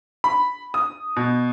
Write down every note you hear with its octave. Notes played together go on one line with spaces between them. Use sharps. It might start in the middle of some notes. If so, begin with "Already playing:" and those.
B5
D#6
B2